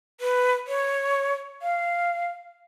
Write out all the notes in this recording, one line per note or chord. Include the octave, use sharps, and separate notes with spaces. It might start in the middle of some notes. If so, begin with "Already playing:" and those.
B4
C#5
F5